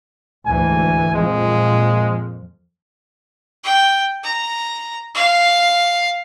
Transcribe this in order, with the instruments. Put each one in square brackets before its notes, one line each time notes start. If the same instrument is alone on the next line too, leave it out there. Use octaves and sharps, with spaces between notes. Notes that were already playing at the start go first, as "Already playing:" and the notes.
[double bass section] D2 G#2 E3 [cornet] G#5
[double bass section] F2 A#2 F3 [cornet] G#3
[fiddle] G5
A#5
F5